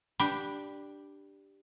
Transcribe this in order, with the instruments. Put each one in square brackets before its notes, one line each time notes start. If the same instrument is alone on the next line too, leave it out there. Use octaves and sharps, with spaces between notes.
[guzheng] D4 G4 [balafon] B5